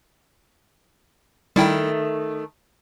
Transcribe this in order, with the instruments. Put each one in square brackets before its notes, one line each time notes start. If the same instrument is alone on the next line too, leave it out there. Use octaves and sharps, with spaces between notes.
[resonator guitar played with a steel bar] D#3 A3 [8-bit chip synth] G3 E4 G5